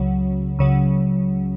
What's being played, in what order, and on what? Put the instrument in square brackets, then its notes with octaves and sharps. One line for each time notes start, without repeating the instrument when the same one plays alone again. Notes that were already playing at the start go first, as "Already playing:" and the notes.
Already playing: [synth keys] C#2 C#3 F#3
C#2 C#3 F#3